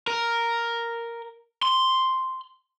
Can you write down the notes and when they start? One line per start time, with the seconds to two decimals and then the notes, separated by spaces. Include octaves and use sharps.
0.07 A#4
1.62 C6